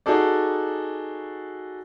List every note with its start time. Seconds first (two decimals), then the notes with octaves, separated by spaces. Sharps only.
0.06 D#4 F#4 G#4 A4 D5